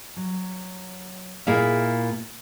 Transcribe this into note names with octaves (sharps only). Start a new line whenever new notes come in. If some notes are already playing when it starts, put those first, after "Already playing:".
F#3
A#2 A#3 E4 G#4 E5 F5